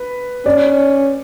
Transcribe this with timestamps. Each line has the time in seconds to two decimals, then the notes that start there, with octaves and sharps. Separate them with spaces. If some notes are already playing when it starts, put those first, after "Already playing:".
Already playing: B4
0.46 C#4 D5